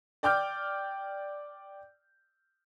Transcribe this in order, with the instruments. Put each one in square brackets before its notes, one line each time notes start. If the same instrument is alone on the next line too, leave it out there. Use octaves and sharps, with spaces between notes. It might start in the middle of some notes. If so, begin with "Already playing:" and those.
[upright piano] D5 G5 D6 F6 G6